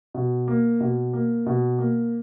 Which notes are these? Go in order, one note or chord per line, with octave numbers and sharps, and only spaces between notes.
B2
A#3
B2
A#3
B2
A#3